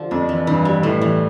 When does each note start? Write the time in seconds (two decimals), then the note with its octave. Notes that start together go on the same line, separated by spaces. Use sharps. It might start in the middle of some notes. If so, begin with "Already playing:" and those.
Already playing: D3 F3 G4
0.11 F2 D4
0.29 E3
0.47 G2 E3
0.65 G3
0.83 A2 E3
1.01 E3